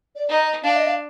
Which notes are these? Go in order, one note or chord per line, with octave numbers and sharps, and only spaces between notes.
D5
D#4
D#5
D4 F5
D#5
F5